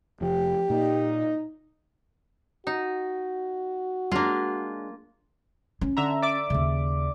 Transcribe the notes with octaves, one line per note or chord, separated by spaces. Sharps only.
F1 F3 G4
A#2 A#3 D#4
D#4 F#4
G#3 A#3 D4 F4
C#4
D3 E5 A#5
D5 E5 D6
D#2 C#3